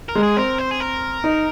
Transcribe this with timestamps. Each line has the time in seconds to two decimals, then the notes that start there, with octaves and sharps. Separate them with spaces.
0.09 A#4
0.15 G#3
0.23 G#4
0.36 C4 A#4
0.58 C5
0.71 G#4
0.80 A#4
1.24 D#4